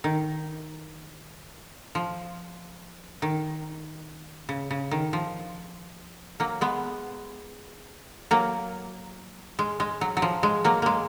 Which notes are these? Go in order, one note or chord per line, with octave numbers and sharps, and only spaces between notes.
D#3
F3
D#3
C#3
C#3
D#3
F3
F#3 A#3
G#3 B3
F#3 A#3
G#3
G#3
F#3
F#3
F3
G#3
F#3 A#3
G#3 A#3